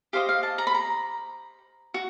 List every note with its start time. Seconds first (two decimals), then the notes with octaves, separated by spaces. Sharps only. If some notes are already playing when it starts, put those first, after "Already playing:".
0.13 G4 C5 D#5 F5
0.29 F5
0.43 A5
0.58 A#5
0.67 B5
0.74 A#5
1.94 F#4